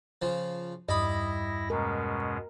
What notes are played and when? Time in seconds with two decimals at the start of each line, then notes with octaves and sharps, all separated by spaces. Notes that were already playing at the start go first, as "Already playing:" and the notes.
0.22 C#3 F3
0.89 E2 G2 G3 E4 D#5 B5 A#6
1.70 B2 G#3 C#4 A#4